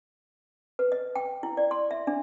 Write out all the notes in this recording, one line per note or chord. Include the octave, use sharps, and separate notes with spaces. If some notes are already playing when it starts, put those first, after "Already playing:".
B4
D#5
G5
E4
D5
C6
E5
D4